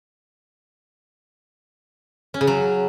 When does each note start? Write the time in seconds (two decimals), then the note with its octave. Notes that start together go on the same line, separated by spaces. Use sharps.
2.34 C#4
2.41 C#3
2.47 F#3